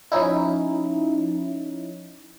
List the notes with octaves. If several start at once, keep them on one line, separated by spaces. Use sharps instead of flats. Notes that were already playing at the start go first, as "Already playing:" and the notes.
F3 C#4 D#4 E4